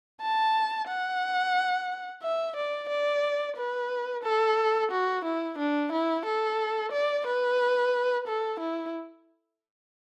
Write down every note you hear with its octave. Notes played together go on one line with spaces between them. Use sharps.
A5
F#5
E5
D5
D5
B4
A4
F#4
E4
D4
E4
A4
D5
B4
A4
E4